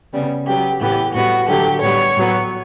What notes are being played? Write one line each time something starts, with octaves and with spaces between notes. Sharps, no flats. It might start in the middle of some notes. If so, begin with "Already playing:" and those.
C#3 G3 B3
C#3 F#3 B3 G4
A2 E3 B3 G4
A2 G3 B3 F#4
D3 F#3 A3 G4
A2 G3 B3 C#5
A2 F#3 B3